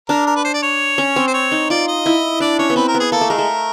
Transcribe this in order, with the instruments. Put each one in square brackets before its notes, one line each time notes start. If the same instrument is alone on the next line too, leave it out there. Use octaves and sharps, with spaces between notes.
[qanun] D4 [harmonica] A#4
[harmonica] A#4
B4
C5
D5
C#5
[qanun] C#4
C4
[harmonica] C5
C#5
[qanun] D#4
[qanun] F4 [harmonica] D5
[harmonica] D#5
[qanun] E4
[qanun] D4 [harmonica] D5
[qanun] C#4 [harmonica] C#5
[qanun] B3
[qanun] C4 [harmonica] B4
[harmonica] A#4
[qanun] B3
[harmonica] G#4
[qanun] A#3 [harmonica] A4
[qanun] A3
[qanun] G#3 [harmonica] A#4
[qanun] A3